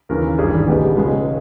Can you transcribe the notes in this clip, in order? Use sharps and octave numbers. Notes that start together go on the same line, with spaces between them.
D#2 C#3 E3 A#4
G#1 G2 E3 G3 G#4
G4
C#2 B2 G#3 B3 G4
C#2 C#3 G#3